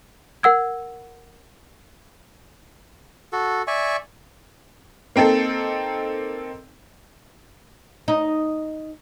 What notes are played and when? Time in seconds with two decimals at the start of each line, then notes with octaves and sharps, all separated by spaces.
0.43 A#4 F#5 E6 G#6
3.33 F#4 A4
3.67 D5 E5 G#5 C#6
5.16 A#3 C4 D#4 A4
8.08 D#4